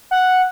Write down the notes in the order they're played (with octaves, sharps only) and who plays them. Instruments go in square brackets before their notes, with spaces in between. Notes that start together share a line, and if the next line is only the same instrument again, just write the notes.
[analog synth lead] F#5